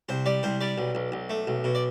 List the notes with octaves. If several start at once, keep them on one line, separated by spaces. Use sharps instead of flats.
C2 C5
G3 D5
C2 C5
G3 D5
B1
B1
B1
A3
B1
B2
D5